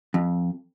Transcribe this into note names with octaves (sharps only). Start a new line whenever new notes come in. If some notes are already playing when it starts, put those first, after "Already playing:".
F2